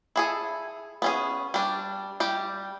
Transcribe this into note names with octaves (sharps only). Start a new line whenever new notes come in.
E4 G#4 A4
B3 C#4 G#4
G3 D4
G3 G4